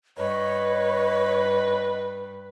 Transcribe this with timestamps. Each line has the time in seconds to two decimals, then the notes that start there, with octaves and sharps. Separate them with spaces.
0.18 G2 B4 C#5 D#5